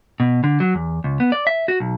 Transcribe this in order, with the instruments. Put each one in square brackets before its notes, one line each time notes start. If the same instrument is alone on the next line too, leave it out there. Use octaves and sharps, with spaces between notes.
[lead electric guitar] B2
D3
F#3
E2
C#2
B3
D5
E5
F#4
B1